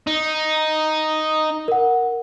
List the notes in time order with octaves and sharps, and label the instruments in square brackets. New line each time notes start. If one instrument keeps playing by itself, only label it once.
[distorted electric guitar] D#4
[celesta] A#4 F#5